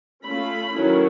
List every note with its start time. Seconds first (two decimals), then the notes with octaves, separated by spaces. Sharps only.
0.25 A3 C#4 F4 B5
0.72 D#3 F#3 A3 C#4 E4